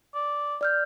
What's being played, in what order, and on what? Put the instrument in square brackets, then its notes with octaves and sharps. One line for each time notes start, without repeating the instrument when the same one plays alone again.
[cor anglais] D5
[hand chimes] D5 F6 G6